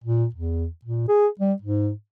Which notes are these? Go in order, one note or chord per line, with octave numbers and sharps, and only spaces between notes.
A#2
E2
A#2
G#4
G3
G#2